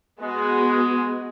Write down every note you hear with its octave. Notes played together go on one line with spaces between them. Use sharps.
G#3 B3 F#4 G#4